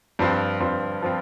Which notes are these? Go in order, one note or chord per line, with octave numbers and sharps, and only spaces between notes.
G2 F3 C4 F4
G2 F3 C4 F4
F3 C4 F4